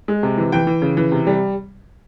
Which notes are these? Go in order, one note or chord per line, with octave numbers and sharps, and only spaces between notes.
G#3
C3
E3
E3 G5
E3
C#3
E3
C3
G3